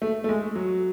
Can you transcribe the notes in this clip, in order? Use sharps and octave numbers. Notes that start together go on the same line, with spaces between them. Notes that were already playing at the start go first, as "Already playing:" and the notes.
A3
A3
G#3
F#3